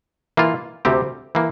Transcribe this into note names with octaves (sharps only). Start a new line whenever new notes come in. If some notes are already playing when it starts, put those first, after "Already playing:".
E3 A#3 F4
D2 C3 G3 C4 G4
E3 A#3